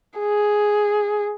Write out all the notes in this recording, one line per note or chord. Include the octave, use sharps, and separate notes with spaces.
G#4